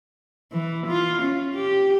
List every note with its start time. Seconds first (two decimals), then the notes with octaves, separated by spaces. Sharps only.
0.52 E3
0.87 F4
1.22 C#4
1.55 G4